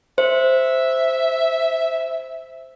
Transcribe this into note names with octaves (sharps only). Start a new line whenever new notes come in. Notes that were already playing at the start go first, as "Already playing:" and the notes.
C5 E5